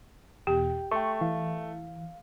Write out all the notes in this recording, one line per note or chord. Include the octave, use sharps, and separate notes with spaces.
E2 B2 G4 G5
A3 G5 C6 C#6
E3 F5